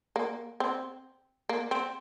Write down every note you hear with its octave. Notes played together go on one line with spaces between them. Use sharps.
A#3
C4
A#3
C4